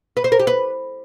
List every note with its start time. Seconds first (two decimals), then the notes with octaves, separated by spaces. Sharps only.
0.17 B4
0.24 C5
0.32 A#4
0.39 G4
0.47 B4